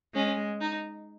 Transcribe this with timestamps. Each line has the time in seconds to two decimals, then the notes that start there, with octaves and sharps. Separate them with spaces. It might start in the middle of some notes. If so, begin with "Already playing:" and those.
0.15 G#3 C#4
0.61 D#4